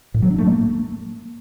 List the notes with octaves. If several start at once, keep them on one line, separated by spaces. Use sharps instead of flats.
A2
F#3
D4
A3
A#3